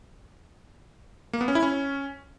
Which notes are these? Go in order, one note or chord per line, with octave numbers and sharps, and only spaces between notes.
A#3
B3
C#4
E4
C#4